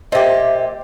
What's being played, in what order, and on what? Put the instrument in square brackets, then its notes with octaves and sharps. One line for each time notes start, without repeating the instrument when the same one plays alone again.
[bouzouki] A#2 G4 [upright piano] C5 [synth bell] D#5 [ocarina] E5